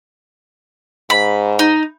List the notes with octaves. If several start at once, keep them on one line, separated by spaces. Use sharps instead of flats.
G#2 B5
D#4